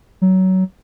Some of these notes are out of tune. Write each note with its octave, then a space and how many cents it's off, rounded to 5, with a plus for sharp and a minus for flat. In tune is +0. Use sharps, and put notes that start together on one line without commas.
F#3 +20